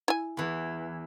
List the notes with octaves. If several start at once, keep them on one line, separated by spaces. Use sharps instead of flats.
E4 G#5
E2 E3